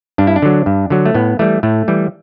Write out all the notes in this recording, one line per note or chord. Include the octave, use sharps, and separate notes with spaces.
G2 D4
E4
D4
D3 F#3
G2
D3 F#3
A3
A2 B3
E3 G3 A3
A2 A3
E3 G3